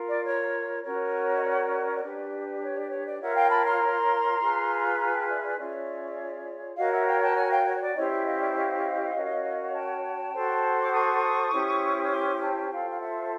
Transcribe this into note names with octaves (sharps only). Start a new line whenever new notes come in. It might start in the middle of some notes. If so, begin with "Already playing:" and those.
Already playing: F4 A#4
D5
C#5
C#4 F#4 A#4 C#5
D#5
D5
D4 G4 B4
C#5
D5
C#5
D5
F4 A#4 C#5 E5 F#5
F5 G5
A5 B5
A#5 C6
F4 G#4 B4
G#5 A#5
G5 A5
D5 E5
D5
C#4 F4 G#4 C#5 D5 E5
F#4 A#4 C#5 D#5 F5
E5 F#5
F5 G5
G5 A5
F#5 G#5
F5 G5
C#5
C#5
D5
C#4 E4 G4 C5 C#5 D#5
D5 E5
D#5 F5
D5 E5
D#5 F5
C#4 F#4 A#4 C#5
G5 A5
F#4 A4 C5
D6
C#6 D#6
C#4 E4 G4 C5
C6 D6
G5 A5
F4 A4 C5 F5 G5
F5
E5 F#5